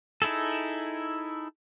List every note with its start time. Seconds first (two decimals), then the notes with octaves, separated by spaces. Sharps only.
0.22 D#4 E4 G#4 A4